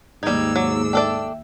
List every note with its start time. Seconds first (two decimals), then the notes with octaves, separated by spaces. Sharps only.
0.23 D#2 G#2 G3 D#4 D5 E6 G#6
0.56 F#3 G#4 D6
0.93 D4 A4 D5 E5 G5